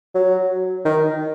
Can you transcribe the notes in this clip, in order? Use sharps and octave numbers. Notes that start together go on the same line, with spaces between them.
F#3
D#3